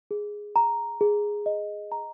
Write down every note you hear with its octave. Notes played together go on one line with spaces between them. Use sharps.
G#4
A#5
G#4
D#5
A#5